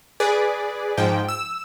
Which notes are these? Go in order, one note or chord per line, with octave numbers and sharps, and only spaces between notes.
G#4 B4 D5
G#2 F3 G5
E6